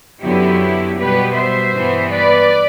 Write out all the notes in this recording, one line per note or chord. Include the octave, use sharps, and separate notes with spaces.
F#2 D3 F#3 B3 E4 G4
B2 G3 B3 G4 B4
C5 E5
G2 E3 B3
B4 D5